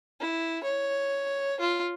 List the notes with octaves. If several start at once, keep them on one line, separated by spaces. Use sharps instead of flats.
E4
C#5
F4